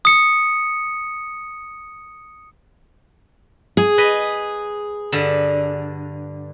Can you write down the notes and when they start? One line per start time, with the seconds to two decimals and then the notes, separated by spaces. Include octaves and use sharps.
0.05 D#6 C#7
3.77 G#4
3.98 B4 D#5
5.12 G2 D3